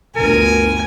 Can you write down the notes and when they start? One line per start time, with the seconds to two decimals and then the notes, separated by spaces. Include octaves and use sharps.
0.16 G1 D2 A#4 G#5